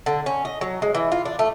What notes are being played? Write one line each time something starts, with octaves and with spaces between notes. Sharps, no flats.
D3
C#4
D#5
F#3
G#3
E3
F4
D4
A3